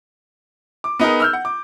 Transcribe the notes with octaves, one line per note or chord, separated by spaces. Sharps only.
D6
B3 D#4 G#4 A#4
E6 F6 G6
F#5
D6